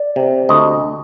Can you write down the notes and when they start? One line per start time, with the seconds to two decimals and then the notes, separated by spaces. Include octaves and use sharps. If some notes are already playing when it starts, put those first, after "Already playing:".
Already playing: D5
0.16 C3
0.49 D2 D#5